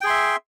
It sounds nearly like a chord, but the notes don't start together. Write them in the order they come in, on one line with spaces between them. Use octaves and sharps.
G5 G#4 C6 E5